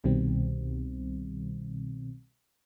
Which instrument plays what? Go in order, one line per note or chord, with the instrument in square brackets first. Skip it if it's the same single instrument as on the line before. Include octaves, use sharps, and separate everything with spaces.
[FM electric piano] C2 B2 D#3 G3 C4